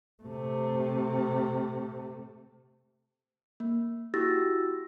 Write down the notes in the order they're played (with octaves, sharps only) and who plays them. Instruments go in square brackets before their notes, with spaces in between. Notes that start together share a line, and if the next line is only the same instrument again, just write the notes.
[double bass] C3 A3
[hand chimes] A#3
E4 F#4 G4 E6 A6 A#6